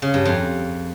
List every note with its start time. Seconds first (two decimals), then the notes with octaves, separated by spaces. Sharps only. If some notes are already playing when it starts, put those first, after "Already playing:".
0.02 C#3
0.14 G2
0.25 F2